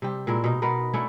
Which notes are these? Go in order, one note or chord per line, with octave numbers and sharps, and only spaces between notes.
C3 G3 G4
A#2 G#3 E4 A#4
B2 D#4
B2 B3 A#4 B4
A3 C#4 D4 E4